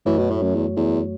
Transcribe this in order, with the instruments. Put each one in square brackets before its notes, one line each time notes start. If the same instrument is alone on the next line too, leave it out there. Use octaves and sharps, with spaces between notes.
[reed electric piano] F#2 F#3 A3 F#4 C#5 [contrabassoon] E3
[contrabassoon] B2
A2
F#2
E2
E2